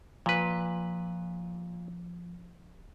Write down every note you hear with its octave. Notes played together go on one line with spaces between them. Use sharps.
A#2 F3 B4